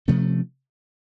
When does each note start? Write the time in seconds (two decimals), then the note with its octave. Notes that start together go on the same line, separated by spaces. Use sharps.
0.08 C3 F3 A3 C#4